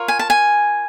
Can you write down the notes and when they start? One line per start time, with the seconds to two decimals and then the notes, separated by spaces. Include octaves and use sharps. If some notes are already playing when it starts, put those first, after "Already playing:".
Already playing: F4 A#4 C#5
0.08 G#5
0.19 A5
0.30 G#5